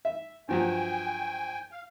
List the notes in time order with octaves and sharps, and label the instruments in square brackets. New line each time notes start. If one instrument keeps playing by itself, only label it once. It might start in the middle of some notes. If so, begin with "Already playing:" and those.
[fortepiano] E5
[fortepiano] G2 F3 F#3 [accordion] G5 G#5
[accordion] F5